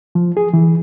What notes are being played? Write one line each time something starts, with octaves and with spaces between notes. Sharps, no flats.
F3
G#4
E3